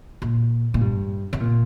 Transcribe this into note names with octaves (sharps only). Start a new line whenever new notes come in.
A#2
A#2
G2
C3
A#2